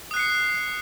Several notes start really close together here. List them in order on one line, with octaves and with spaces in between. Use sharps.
D#6 F#6 C7 C#7